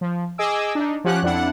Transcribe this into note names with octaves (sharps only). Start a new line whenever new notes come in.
F3
G#4 D#5 G#5 D6 E6
D4 D#4
F3 C#4 G4 F#5 F#6
F2 D4 E4 F#5